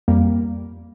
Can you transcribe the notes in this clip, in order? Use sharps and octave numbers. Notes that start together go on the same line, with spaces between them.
F2 G3 A#3